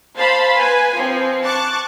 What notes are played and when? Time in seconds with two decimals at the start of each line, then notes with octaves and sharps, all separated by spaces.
0.17 C5 F5 A5 B5 C6
0.56 B4 G#5
0.95 F3 C4
1.43 A5 C#6 D6 F#6